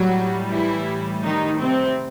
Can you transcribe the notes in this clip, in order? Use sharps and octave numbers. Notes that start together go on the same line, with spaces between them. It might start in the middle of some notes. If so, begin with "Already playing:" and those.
Already playing: A2 F#3 G3 F#4
E3 E4
D#3 D#4
C3 C4